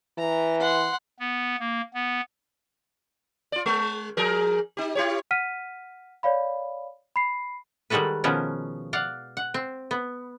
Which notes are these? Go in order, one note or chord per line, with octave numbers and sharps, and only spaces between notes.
E3 A#5
F#5 C6
B3
A#3
B3
F4 D5
G#3
F3 G#4 A#4
D#4 G4
E4 G4 C#5
F#5 F6 B6 D#7
C#5 D5 F5 B5
B5 C7
D#3 G3 G#3 F#4 A4 B4
B2 D#3 F3 B3 C#4
D5 F5 F#5
F#5
C4
B3